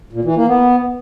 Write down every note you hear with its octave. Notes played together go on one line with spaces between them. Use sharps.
A#2
E3
A#3
B3